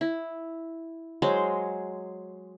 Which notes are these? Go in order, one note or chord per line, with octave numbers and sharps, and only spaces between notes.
E4
F#3 G#3 C5